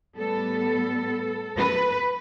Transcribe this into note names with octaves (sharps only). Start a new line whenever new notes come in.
A2 G3 B3 A4
B4